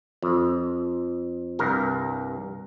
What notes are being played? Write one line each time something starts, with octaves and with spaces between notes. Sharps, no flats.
F2
C2 G2 A#4